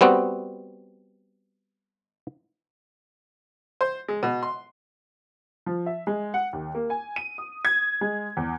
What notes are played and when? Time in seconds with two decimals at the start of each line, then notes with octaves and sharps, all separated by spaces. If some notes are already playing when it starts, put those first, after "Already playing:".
0.01 G3 B3 C4 F#4
3.81 C5
4.08 G#3
4.23 B2
4.43 C6
5.66 F3
5.86 E5
6.07 G#3
6.34 F#5
6.53 D#2
6.75 A#3
6.90 G#5
7.16 D#7
7.38 D#6
7.65 G#6
8.01 G#3
8.37 E2